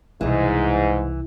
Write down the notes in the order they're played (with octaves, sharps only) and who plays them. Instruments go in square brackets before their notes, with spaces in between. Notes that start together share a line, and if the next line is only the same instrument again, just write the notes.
[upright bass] C2 B2 [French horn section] G#2 [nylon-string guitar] E3